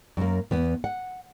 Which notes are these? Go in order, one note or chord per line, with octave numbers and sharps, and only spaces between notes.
F#2 A#3
E2 B3
F#5